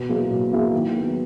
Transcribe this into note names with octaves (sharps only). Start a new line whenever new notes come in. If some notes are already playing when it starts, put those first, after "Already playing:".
Already playing: B2
F#3 A#3 E4 G#4
B2
F#3 A#3 E4 G#4
D#3
F#3 B3